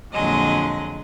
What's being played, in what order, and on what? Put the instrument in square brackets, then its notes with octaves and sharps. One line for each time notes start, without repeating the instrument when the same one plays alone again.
[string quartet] F2 A#2 D3 F#3 G#3 D#5